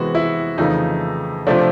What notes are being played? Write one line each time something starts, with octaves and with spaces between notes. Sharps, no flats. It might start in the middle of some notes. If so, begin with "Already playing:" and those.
Already playing: C3 E3 G#3 B3 F#4
E4
F2 C#3 E3 A3 D#4
C3 F3 A3 D4